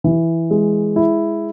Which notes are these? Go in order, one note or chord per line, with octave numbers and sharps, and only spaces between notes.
E3
G#3
E4